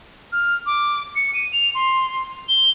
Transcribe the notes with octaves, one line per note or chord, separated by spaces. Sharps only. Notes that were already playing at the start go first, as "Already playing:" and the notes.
F6
D6
C#7
D#7
F7
C6
G7